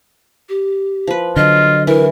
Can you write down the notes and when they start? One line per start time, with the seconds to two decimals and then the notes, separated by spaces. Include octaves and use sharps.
0.49 G4
1.07 F3 B4
1.36 D3 F#3 F4 D#5
1.87 E3 A#4